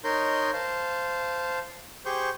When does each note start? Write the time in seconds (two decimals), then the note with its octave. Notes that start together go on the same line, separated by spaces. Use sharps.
0.04 D#4 A#4 C#5 D#5 C6 G6
0.53 C5 F5 A5
2.06 G4 G#4 C5 C#6 G6